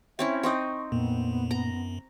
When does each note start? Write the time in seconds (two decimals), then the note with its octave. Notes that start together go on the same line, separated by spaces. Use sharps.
0.19 C4 C#4 E4 E5
0.43 C4 D#4 D#5 C#6
0.92 F2 A#2 B3
1.51 F#2 A#5